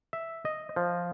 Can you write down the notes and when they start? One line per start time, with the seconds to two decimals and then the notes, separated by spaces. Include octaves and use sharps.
0.13 E5
0.45 D#5
0.76 F3